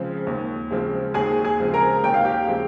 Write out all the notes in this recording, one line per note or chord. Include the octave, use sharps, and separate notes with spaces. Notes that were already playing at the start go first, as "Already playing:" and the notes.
Already playing: C#3 F3 G#3 C4
D#2
C#3 F3 G#3 C4
D#2 G#4 G#5
G#4 G#5
C#3 F3 G#3 C4
A#4 A#5
D#2 G5
F5
G4 G5
C#3 F3 G#3 C4